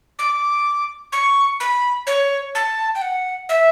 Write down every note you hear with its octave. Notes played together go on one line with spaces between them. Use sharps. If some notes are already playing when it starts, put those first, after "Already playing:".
D6
C#6
B5
C#5
A5
G5
F#5
E5